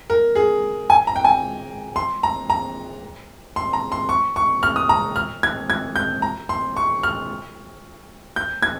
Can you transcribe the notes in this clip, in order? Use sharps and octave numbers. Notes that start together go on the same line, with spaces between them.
A#4
G#4
G#5
A#5
G5
G#5
C6
A#5
A#5
C6
A#5
C6
C#6
C#6
F6
D#6
A#5
F6
G#6
G#6
G6
A#5
C6
C#6
F6
G6
G#6